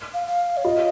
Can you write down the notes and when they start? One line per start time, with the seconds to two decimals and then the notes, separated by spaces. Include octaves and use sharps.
0.14 F5
0.27 F5
0.57 C#5
0.64 F4 D#5